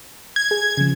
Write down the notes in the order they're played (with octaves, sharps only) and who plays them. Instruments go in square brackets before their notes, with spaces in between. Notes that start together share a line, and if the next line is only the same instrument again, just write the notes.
[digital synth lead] G#6
[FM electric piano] G#4
C#3 F3